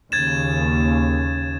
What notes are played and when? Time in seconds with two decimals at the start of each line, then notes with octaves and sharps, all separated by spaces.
0.12 D#2 C#3 G#6 A6 E7